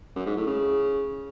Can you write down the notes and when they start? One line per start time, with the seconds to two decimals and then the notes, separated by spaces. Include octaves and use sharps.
0.16 F#2
0.26 G#2
0.36 A2
0.47 C#3